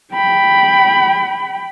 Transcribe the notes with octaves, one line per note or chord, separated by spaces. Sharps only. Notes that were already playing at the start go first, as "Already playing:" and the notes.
G5 B5